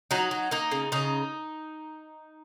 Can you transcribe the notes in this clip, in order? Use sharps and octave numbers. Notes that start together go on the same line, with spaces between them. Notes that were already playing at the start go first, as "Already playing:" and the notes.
F#3 D#4
F#3
A#3 D#4
C#3
C#3 D#4